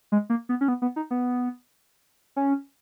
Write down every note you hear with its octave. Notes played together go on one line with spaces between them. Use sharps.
G#3
A#3
B3
C#4
B3
B3
D#4
B3
C#4